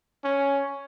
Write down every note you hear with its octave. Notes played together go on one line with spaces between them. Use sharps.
C#4